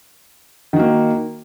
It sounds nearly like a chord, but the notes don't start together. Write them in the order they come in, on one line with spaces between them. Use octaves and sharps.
D#3 F#4 A#3